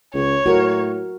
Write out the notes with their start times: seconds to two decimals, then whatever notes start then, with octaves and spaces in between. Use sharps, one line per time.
0.14 C#2 C#5
0.46 A2 F#4 A#4